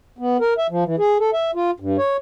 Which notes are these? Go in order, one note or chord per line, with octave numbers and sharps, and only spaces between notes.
B3
A#4
E5
F3
E3
G#4
A4
E5
F4
G2
C#5